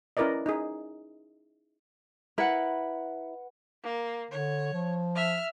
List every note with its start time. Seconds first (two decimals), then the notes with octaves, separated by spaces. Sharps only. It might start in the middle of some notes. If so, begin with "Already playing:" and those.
0.17 C#4 E4 A#4 B4 D5 D#5
0.46 D#4 G#4
2.38 E4 A#4 B4 F#5
3.83 A#3
4.31 D3 C#5
4.73 F3
5.15 E5 F6